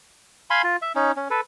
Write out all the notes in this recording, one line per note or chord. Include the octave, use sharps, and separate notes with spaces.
F5 G#5 B5 C6
F4
E5
C#4 D#4
C#4
A4 B4